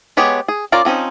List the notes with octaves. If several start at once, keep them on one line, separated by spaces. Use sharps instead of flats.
G#3 B3 G4 G#4 C#5
G#4
C#4 F4 A#4 D5
F3 C4 C#4 D#4